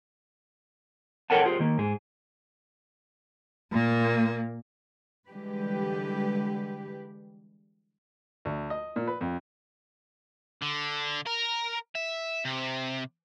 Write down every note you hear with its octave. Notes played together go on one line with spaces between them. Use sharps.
A4 A#4 C#5 F#5 G5 A5
F4 G4 G#4 C5
D#3 A#3
G#2 G#4
A#2 A#3
D3 E3 G3 G#3 G4 B4
D2
D#5
A#2
B4
F2
D3
A#4
E5
C3